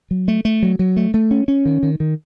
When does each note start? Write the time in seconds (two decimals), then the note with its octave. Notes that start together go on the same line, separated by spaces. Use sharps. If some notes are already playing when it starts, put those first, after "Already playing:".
0.11 F#3
0.28 A3
0.45 A3
0.63 F#3
0.79 F#3
0.97 A3
1.14 A3
1.31 C#4
1.48 C#4
1.65 D#3
1.83 D#3
2.00 D#3